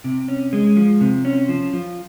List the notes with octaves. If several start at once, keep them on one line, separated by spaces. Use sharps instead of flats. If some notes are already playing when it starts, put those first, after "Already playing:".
C3
C#4
G#3
F3
C3
C#4
F3
F3